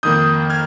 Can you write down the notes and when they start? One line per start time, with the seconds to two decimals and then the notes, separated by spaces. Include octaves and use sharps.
0.03 F2 D#3 A#3 D#6 G6
0.50 F6 G#6